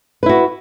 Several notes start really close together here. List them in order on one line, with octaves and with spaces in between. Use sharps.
B4 E4 F#4